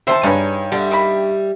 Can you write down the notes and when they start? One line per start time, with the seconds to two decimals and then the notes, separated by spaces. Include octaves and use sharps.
0.07 D#3 C5 E5 G5 A5
0.23 G2 D4 D#4 G#4 B4 C#5
0.72 D3 G3 E5
0.91 D#3 A#3 B5